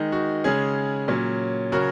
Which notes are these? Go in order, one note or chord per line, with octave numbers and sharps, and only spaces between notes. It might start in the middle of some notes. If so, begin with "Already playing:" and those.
Already playing: D#3 G#3 D#4
F#4
C#3 G#3 C#4 G#4
A#2 F#3 C#4
C#3 F#3 C#4 F#4 A#4